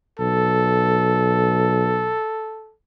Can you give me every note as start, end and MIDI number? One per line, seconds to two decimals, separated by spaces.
0.19 2.16 35
0.19 2.74 69